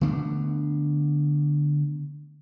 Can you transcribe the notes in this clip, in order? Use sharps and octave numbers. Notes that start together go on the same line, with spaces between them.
D3 A3 B3 D4